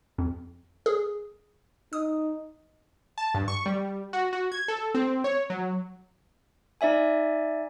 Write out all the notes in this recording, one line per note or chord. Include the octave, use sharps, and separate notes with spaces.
F2
G#4
D#4 D#6
A5
G2
C#6
G3
F#4
F#4
G#6
A4
C4
C#5
F#3
D#4 D5 E5 G#5